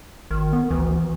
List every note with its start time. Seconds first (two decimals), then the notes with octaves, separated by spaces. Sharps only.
0.31 G#1 D#3
0.53 B3
0.70 D2 E3